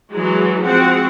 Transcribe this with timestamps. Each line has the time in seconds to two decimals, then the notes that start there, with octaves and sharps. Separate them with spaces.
0.12 E3 F#3 G#3 F#4
0.64 F3 G#3 C4 F#4 F#5